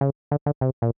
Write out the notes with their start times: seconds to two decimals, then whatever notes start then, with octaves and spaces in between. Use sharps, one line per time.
0.01 C#3
0.31 D3
0.46 D3
0.61 C3
0.82 A#2